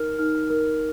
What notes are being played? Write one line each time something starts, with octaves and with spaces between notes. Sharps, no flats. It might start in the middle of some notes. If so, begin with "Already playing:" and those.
Already playing: D#4 A#4 F6
D#4 F6
A#4